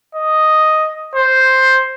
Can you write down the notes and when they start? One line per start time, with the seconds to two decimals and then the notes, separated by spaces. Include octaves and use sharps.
0.16 D#5
1.16 C5